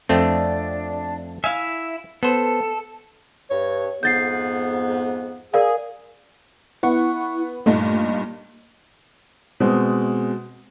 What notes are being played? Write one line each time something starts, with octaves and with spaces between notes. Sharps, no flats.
F2 A3 C4 D4
E4 E5 F5 G#5
B3 A4 C5
G2 C#5
F2 G#2 B3 G6 A6 C7
G#4 A#4 D5 F5
B3 E4 F#5 C#6
G2 A#2 A3 D#4
B2 G#3 C4